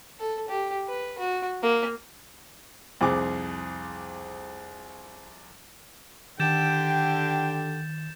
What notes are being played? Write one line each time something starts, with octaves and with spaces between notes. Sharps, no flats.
A4
G4
B4
F#4
A#3
C2 F2 G#4 D6
D3 D#3 G4 G5 G6 A6 E7